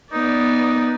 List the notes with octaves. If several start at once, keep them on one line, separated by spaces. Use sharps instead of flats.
B3 D#4 D5